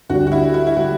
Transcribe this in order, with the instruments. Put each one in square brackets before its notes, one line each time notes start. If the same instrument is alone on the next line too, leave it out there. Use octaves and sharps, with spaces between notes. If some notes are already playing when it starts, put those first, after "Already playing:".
[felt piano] D2 D3 G3 [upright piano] F#4
[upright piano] F#4
E4
E4
E4
[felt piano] D3 G3 [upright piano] F#4